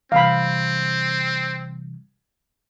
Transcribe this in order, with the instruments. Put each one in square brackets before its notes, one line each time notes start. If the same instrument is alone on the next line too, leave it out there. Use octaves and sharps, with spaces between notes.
[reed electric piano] C3 E3 G3 [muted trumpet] C4 [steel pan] F5 B5